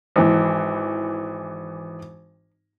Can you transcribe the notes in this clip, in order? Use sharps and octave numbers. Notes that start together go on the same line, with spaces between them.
G#1 E3